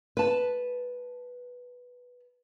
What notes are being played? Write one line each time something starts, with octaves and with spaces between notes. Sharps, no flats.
B4 A5